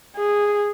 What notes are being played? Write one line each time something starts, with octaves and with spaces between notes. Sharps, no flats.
G#4